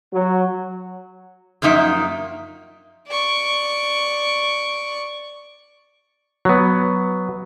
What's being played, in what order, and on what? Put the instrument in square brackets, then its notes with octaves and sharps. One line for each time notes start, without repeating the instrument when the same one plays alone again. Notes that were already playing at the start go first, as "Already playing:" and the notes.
[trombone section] F#3
[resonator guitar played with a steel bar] F#2 F3 A#3 D#4 E5
[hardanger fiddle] D5 C#6
[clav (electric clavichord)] F#3 B3